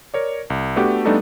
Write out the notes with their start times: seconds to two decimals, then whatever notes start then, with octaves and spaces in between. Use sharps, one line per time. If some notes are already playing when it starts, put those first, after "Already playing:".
0.14 A#4 C#5 D5
0.50 C2
0.76 A3 B3 D4 F#4 G4
1.05 G3 A3 B3 D4 D#4 A4